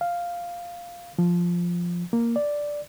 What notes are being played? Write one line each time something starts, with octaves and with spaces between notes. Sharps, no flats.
F5
F3
A#3
D5